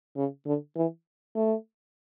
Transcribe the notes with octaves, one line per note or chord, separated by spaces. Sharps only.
C#3
D3
E3
A3